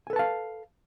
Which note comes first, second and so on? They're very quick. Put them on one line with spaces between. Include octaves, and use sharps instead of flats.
G#5 A4 B4 A5 F5